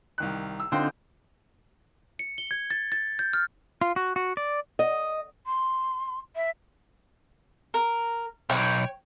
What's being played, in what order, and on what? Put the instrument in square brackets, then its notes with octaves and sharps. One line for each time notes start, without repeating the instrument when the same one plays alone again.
[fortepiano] C2 D#3 F#6
E6
[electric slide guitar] D3 C4 D#4 [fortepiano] F4 C5 G5
[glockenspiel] C#7
G7
G#6
A6
A6
G6
F6
[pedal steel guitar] F4
F#4
F#4
D5
[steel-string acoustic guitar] D#5
[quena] C6
E5
[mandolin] A#4
[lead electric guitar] B1 [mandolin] C#5 G5